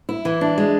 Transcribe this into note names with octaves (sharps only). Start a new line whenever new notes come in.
E4
E3
D4
G#3